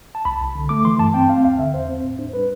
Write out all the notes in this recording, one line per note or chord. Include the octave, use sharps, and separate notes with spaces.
A5
C2 B5
C2
D3
A3 D6
E3 C6
G2 A5
C4 G5
C4 F5
D2 F5
D3 E5
E2 C5
C4
A2
D4
G3 B4